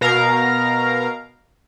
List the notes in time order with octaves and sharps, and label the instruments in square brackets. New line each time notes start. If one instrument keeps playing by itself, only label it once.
[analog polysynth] B2 A#4 F5 A#5